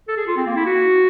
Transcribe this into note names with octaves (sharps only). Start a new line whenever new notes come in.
A4
G#4
F4
C4
A#3
E4
F#4